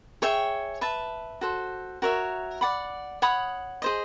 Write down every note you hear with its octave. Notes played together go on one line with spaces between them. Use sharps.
G#4 C#5 E5 G5
B4 E5 A5
F#4 A4 C5
F#4 A#4 C#5 E5
D5 F#5 B5
C#5 F#5 B5 D#6
G#4 C5 D#5